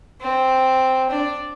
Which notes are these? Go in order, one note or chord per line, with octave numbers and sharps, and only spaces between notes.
C4
D4